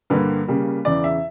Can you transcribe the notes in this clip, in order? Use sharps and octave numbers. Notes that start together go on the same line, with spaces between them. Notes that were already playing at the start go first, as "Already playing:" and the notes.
G2 D3 G3 A#3 B4
C#3 G3 A#3
E2 C#3 E3 D5
E5